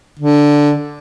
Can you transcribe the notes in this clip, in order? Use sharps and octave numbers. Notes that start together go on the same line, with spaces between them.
D3